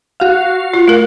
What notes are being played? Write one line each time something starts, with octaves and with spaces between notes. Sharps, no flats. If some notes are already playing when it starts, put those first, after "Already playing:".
F#4 F5
F4
A3 A#4